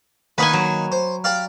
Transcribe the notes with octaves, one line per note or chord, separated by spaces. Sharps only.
D#3 A#3 D#4 B4 F#5 G#5
F#3
C5
G4 D5 F5